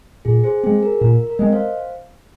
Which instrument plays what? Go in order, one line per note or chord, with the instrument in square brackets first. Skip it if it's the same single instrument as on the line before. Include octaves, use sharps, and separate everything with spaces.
[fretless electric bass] A#2 [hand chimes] G#4
[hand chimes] G#4 C5
[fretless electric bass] G#3 C4 [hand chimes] G#4
[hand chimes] A#4
[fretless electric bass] A#2 [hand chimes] A#4
[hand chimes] A#4
[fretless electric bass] G#3 C4 [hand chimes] D#5
[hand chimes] C5 F5